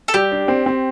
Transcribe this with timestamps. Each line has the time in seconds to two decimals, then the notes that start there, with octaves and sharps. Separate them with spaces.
0.08 A4
0.14 G3 G4
0.32 D4
0.48 C4
0.66 C4